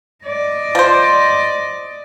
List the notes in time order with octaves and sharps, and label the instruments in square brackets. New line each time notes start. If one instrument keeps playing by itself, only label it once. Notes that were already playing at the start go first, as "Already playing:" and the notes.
[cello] D5 D#5
[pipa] F3 C5